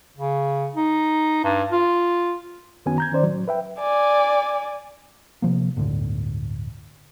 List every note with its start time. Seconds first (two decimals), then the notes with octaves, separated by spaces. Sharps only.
0.17 C#3
0.75 D#4
1.44 G2
1.72 F4
2.86 F#2 D#3 B3 C#4 F#4 G#5
2.98 A#5 G6 G#6
3.12 D#3 C#4 C5 D5
3.23 A2 F#3
3.48 B4 E5 G5
3.79 D5 G#5
5.42 C3 F3 A#3
5.77 G1 D2 A2 D3